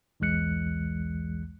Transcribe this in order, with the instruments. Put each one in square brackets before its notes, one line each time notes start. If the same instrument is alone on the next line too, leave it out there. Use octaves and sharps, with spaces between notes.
[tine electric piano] B1 E2 E3 G#3 F#6 C#7